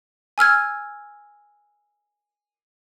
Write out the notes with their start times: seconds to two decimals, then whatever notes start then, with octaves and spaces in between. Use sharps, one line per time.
0.38 G#5 E6 F6 G#6